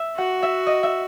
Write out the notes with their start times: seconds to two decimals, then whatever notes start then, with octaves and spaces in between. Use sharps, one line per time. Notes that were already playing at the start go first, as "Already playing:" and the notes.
Already playing: E5
0.17 F#4 F#5
0.43 E5
0.66 D#5
0.83 E5